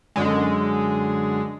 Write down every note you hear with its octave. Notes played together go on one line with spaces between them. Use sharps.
F#2 D3 G#3